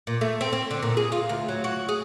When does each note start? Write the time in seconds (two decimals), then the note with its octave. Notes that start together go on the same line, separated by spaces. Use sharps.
0.07 A#2
0.21 A3
0.41 C4
0.53 C4
0.71 D3
0.82 A#2
0.97 G#4
1.12 F4
1.29 D2
1.49 F#3
1.64 F#4
1.89 G#4